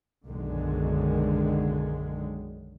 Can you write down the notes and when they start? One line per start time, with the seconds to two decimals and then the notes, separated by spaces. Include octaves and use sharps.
0.26 B1 F#2 D3 D#3 G#3